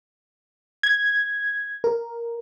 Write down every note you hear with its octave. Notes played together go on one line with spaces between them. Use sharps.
G#6
A#4